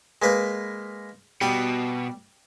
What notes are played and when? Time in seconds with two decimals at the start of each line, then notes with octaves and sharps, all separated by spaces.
0.22 G#3 A#3 B4
1.41 B2 G3 D#6